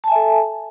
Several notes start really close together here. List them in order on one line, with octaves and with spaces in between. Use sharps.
A5 G#5 E5 A4